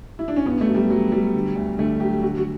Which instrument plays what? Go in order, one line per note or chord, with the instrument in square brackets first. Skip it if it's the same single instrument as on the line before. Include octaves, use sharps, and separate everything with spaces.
[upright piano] E4
D4
C#4
G2 B3
A3
F#3
G3
F#3
F#3 G3
D3
D2
D3 A3
F#3 G4
D3 F#4
F#4